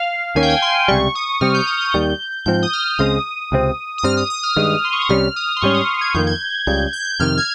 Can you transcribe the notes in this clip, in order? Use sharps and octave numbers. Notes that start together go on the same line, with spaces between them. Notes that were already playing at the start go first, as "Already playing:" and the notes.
Already playing: F5
D#2 D#3 A#3 C#4 G#5
G5
G#5
C6
C#2 C3 G3 C#6
D#6
C3 G3 C4 F6
G6
D#6
D#6
D#2 D#3 G3 G6
G#2 F3 C4 G6
D#6
F6
C#2 C#3 G#3 C4 D#6
C#2 C3 F3 C4
D#6
G2 G3 C4 F6
D#6
D#6
F6
G2 D#3 G#3
C6
C#6
D#6
C2 C3 G3 C#4 F6
D#6
C6
G#2 G3 C#4 C#6
D#6
G#6
F2 D#3 A#3 G6
G#6
C#2 C#3 G3 G6
G6
F2 C3 D#3 F6
G#6